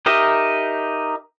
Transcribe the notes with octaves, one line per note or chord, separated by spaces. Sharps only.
D#4 G4 A#4 D#5 E5